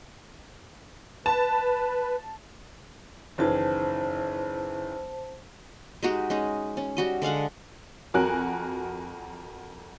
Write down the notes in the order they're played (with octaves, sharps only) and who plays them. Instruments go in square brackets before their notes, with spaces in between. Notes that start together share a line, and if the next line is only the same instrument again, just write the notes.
[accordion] B4 [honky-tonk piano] A5
[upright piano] F#1 D#3 E3 [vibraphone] C5 A5
[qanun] G#3 D#4 F#4 G4
G#3 C#4 D#4
C#4
G3 F#4 D#5
D3 G#3 F5 F#5
[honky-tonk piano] F2 F#4 A#4 G#5 F#6